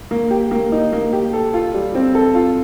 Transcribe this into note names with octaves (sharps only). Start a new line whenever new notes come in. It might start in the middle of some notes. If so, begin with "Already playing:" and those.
A#3
G4
A#3
D#4
A#3
G4
A4
F4
G3
C4
A4
F4